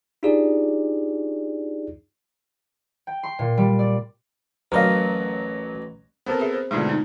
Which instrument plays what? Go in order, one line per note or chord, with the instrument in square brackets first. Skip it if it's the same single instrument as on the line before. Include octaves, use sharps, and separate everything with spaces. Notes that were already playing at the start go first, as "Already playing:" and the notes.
[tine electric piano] D4 D#4 F4 G4 G#4 D5
[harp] G5
C6
A#2
G3
D5
[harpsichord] A1 D#5 [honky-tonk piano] F#3 [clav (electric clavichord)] A#4 F5
[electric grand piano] B3 A4 A#4 [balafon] C4 F#4 C5
[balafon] G#4 E5
C5
[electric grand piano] G#2 B2 D3 [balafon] A3 F4 F#4
[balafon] B3 D#4